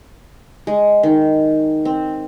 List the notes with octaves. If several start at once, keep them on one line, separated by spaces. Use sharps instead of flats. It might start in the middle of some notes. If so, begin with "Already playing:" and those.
G#3
D#3
C4